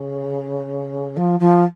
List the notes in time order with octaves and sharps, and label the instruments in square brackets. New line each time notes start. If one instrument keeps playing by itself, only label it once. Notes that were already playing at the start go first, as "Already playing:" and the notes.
Already playing: [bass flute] C#3
F3
F3